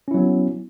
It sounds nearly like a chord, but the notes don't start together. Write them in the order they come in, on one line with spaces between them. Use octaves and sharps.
C#4 E4 F#3 B3